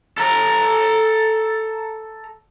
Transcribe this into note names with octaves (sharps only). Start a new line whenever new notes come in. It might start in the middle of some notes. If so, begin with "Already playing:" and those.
A4 A#5